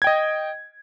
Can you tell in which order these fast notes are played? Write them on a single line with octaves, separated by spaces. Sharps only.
G#6 G5 D#5